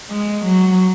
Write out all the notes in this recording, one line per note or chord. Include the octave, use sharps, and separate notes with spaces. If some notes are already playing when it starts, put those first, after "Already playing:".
G#3
F#3